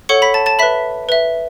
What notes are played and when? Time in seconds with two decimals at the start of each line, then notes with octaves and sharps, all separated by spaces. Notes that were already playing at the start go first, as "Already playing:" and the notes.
0.09 A4 C#5 F#5 C#6 C#7
0.22 B5 B6
0.34 A5 A6
0.46 A5 A6
0.59 B4 E5 B5 B6
1.09 B4 E5